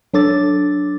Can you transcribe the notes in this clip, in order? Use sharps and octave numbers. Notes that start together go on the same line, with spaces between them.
F#3 D4 A4 D6 A6